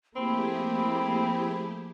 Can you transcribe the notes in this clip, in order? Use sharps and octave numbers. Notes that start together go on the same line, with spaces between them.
F3 A3 A#3 C4 E4 G4 G#4 B5